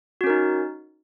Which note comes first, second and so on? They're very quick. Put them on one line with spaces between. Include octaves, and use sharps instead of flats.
F#4 C#4 A#4 D#4